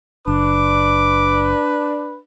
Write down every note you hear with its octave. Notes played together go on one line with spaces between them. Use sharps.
F#1 D4 B4 D6